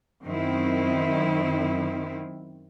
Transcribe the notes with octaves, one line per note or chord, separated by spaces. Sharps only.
F#2 D#3 C4 E4